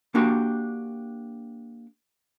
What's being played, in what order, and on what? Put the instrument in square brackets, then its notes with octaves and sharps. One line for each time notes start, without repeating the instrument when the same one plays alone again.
[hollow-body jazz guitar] A#3 D4 F#4 G4